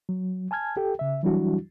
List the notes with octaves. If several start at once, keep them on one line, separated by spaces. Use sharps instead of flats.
F#3
G#5 A5 F6 G#6
G4 A4 G5
C#3 E5
E3 F#3 G3 D4 E4 F#4